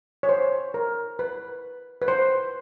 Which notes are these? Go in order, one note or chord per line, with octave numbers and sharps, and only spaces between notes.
C#5
C5
A#4
B4
B4
C5